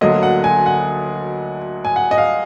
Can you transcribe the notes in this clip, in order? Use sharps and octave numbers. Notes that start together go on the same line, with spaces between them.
D2 D3 F#3 A#3 D#5
F#5
G#5
F#5
G#5
F#5
D#5
F5